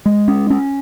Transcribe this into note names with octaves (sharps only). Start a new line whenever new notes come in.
G#3
C#4
C#4